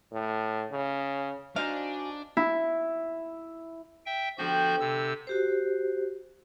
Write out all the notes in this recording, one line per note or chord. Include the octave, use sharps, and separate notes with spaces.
A2
C#3
D4 D#4 F#4 C5 F5 G#5
E4
E5 G5
D3 F3 B3 F#4 G4 G6
C3 B4 E6
F#4 G4 C5